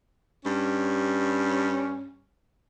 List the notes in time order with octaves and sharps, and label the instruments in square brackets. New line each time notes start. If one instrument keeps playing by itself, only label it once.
[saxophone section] G2 C#4